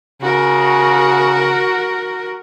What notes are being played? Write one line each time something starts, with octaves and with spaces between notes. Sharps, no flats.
C#3 F#4 A#4